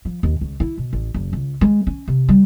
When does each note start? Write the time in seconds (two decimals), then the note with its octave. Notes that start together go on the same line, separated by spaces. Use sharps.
0.05 F3
0.23 D#2
0.41 C#2
0.60 E4
0.77 B2
0.93 A1
1.14 F#1
1.33 C#2
1.61 G#3
1.87 C#4
2.08 C3
2.29 G3